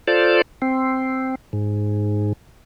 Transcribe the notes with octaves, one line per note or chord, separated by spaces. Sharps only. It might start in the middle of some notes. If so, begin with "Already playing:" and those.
F4 A4 C5 D5
C4
G#2